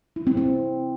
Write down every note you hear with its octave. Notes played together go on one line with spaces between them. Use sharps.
E4
C4
C4